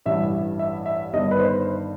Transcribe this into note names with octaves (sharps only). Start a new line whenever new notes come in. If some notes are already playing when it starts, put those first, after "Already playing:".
A1 G2 E3 E5
E5
E5
G1 G2 D#3 D#5
B4
C5